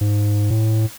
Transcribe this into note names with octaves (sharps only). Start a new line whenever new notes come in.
G#2
A2